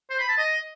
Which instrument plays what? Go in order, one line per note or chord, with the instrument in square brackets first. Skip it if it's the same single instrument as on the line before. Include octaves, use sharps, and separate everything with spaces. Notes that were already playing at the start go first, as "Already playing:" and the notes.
[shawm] C5
B5
A5
D#5